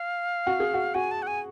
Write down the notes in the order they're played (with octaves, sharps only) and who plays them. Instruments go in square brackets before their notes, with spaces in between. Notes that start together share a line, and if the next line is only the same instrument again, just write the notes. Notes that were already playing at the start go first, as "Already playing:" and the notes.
Already playing: [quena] F5
[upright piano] F#4
G#4
F#4
[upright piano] F#4 [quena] G#5
[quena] A5
F#5
G#5